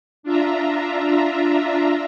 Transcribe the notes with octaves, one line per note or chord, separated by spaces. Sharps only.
D4 F4 E5 A#5